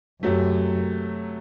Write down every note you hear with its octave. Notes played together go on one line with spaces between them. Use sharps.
F#2 C3 F#3 A3